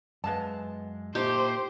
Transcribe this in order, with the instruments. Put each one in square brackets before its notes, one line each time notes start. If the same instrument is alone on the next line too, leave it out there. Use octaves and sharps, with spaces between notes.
[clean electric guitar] F#2 G#3 [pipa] B3 F5 A5
[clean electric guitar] A#2 [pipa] A3 D#4 [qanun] G4 [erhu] C5